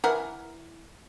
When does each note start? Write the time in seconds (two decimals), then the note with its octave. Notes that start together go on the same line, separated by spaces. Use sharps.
0.04 E3 A#4 F#5